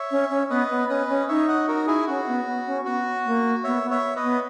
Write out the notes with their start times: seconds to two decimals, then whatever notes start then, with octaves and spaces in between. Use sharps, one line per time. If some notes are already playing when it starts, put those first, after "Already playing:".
Already playing: C#5 E5
0.11 C#4
0.30 C#4
0.50 B3 B4 D#5
0.70 B3
0.89 C#4 B4 D#5
1.09 C#4
1.28 D#4 C#5 E5
1.48 D#5 F#5
1.67 D#4 F#4 A#4
1.87 E4 G#4
2.07 C#4 F#4
2.27 B3
2.46 B3
2.67 C#4
2.85 B3 F#4
3.25 A#3
3.64 B3 C#5 E5
3.83 B3
3.91 C#5 E5
4.16 B4 D#5
4.23 B3